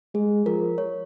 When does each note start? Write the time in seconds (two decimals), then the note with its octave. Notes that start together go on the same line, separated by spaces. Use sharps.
0.14 G#3 G#4
0.46 F3 A#4
0.78 C#5